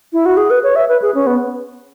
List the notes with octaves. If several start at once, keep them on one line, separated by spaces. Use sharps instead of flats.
E4
F#4
G#4
B4
C#5
E5
B4
G#4
C#4
B3